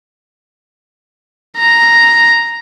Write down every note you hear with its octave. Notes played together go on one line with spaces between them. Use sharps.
A#5